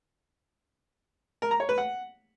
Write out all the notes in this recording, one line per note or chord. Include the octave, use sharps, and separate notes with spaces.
A#4
A#5
C#5
B4
F#5